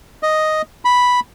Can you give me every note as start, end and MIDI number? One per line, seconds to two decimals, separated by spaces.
0.23 0.62 75
0.85 1.20 83